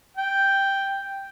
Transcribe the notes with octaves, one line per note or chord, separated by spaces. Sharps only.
G5